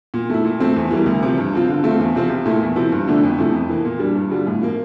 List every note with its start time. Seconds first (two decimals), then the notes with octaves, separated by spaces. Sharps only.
0.14 A#2
0.30 A3 E4
0.45 A#2
0.60 F3 A3 C4
0.76 E2
0.91 E3 G3 A#3
1.06 D2
1.23 C3 F3
1.37 G2
1.53 F3 C4 F4
1.69 D3
1.84 A3 C4 F4
1.99 E2
2.15 C3 F3 C4 F4
2.29 C2
2.46 A#2 A3 E4
2.61 E2
2.76 C3 F3 C4 E4
2.92 G2
3.07 D3 F3 A3 D4
3.23 F2
3.38 C3 F3 A3 E4
3.53 F2
3.69 E3 A#3
3.85 A#2
3.99 G3 D4
4.15 G2
4.31 D3 G3 D4 F4
4.47 A2
4.62 F3 A#3